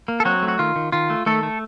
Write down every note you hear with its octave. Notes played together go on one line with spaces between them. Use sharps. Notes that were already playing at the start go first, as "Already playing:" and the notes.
A#3
A4
F#3 C4 F#4
A3
F#4
D#3 F4
D#3
D#3 F4
A3
D#3 A3 A4
A3